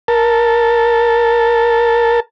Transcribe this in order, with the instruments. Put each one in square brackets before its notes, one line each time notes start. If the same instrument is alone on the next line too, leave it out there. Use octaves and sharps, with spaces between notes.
[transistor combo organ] A#4 A5